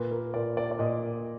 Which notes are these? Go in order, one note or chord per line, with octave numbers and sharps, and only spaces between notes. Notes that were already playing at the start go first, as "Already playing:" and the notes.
Already playing: A#2 B4
A#4
A#2 D5
D5
D5
A#2 D#5